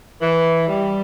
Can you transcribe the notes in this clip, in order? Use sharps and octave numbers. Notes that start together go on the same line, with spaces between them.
E3
G3